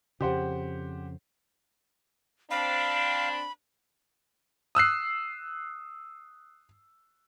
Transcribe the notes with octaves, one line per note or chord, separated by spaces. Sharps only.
F2 C#3 G4 C5 F#5
C4 D4 F5 B5
D#6 E6 F#6 C7